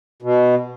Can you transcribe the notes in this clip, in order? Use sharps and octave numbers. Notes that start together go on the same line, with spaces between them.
B2